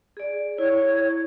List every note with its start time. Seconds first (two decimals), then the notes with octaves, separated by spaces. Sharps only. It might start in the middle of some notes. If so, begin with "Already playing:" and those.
0.17 G#4 D5
0.58 E4 C#5